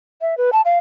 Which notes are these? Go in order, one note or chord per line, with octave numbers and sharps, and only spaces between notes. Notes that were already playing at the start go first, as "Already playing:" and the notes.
E5
B4
A5
F5